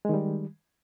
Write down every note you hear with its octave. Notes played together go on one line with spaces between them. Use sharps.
D#3 G3 G#3